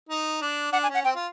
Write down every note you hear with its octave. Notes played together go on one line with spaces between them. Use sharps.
D#4
D4
D4 F#5
G#5
C#4
F#5
C4 G5
F4